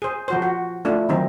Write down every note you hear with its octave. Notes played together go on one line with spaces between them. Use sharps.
G#4 C5
F3 F#4 C5
F#4
A3 D4 E4 F4
D#3 F#3 C4 D#4